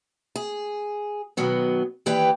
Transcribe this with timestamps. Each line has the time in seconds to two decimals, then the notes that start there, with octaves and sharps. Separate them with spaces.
0.36 G#4
1.37 B2 D#3 F#3 B3
2.06 D#2 E3 G4 B4 D5 G5